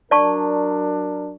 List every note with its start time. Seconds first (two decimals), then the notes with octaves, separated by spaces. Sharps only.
0.11 F#3 D4 A#4 D5 A5 C#6